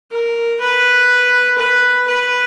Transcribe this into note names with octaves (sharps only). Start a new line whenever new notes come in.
A#4
B4
B4
B4